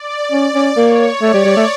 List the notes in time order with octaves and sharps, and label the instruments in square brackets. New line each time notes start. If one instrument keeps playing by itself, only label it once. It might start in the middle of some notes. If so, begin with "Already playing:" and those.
Already playing: [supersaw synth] D5
[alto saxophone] C#4 [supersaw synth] D5
[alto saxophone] C#4
[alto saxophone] A#3 [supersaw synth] C#5
[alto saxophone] A3 [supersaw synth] D5
[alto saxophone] G3
G3
A3